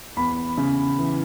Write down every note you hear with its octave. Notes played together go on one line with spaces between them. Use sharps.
E2 B5
C#3
E3